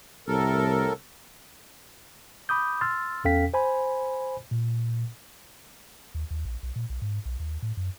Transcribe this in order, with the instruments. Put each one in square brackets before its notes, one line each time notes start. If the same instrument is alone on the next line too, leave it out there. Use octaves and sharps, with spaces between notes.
[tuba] C2 [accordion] A2 A4 A#4
[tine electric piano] B5 D6 D#6 G6
C6 E6 F6 A6
E2 C#4 A4 F5 G5 B6
C5 G#5 B5
A#2
[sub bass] D#2
D#2
A#1
B1
A#2
B1
G#2
B1
D#2
A2
F#2